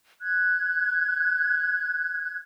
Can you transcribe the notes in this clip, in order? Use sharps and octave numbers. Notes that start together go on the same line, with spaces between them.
F#6 G#6